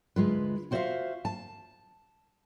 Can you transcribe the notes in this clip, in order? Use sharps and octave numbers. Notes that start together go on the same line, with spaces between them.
D2 G#3 F4 B4
F4 F#4 C5 D5 E5 F5
A5